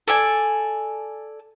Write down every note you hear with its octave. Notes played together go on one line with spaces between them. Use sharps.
A4 D5 G#5